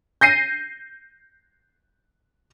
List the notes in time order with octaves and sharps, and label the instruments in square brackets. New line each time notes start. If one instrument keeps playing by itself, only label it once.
[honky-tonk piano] G6 A#6 C7 D#7